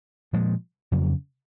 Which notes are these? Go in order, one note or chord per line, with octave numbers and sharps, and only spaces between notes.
A#2 F3 G#3
F2 C#3 F#3